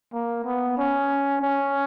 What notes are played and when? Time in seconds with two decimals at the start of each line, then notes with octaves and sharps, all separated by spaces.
0.13 A#3
0.45 B3
0.78 C#4
1.41 C#4